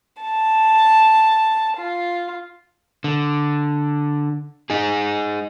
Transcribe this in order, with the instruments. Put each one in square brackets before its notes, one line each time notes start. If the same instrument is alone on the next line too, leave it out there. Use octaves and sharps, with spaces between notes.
[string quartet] A5
F4
[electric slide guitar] D3
D#4 G#4